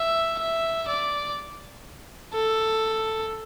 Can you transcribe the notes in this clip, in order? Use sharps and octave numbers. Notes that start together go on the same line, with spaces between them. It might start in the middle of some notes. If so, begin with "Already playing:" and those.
Already playing: E5
E5
D5
A4